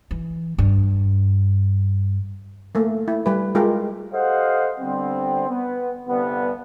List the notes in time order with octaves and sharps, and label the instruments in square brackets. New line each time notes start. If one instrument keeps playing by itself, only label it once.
[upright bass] E3
G2
[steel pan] A3 A#3
E4
G3 B4
G#3 F4 G4 A#4
[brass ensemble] G4 A4 C5 D#5 F5 F#5
D3 G3 B3 C4
B3
C2 G2 D3 G3 B3